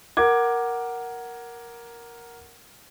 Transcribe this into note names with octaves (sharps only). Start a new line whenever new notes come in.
A#4 F#5 D6 G#6